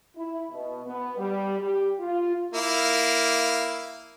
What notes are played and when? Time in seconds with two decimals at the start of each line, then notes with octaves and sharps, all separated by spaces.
0.17 E4
0.52 B2
0.86 B3
1.18 G3
1.59 G4
1.99 F4
2.54 A#3 E4 F5